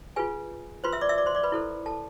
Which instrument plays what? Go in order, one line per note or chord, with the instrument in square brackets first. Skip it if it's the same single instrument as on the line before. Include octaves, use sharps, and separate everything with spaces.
[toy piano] F4 G#4 B4 G#5
F4 B4 C5 C6
E5 E6
D5 D6
E5 E6
D5 D6
C5 C6
D5 D6
B4 B5
E4 A4 C5
A4 A5